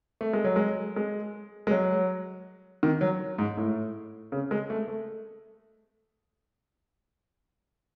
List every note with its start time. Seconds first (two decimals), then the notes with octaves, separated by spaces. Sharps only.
0.21 A3
0.33 G#3
0.44 F#3
0.56 G#3
0.96 G#3
1.67 G#3
1.71 F#3
2.83 D#3
3.01 F#3
3.38 G#2
3.57 A2
4.32 C#3
4.51 G#3
4.70 A3
4.88 A3